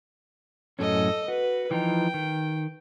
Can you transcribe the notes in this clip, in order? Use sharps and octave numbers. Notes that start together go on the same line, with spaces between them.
F#2 A2 C#4 A4 D#5
F#4 B4
E3 F3 D#4 G5
D#3